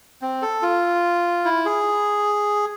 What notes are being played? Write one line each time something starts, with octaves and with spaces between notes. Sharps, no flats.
C4
A4
F4
E4
G#4